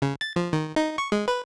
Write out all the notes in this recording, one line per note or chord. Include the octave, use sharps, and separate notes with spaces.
C#3
A6
F3
D#3
D#4
C#6
G#3
B4